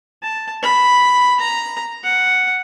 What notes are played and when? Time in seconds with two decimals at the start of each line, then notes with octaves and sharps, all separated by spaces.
0.23 A5
0.63 B5
1.40 A#5
2.04 F#5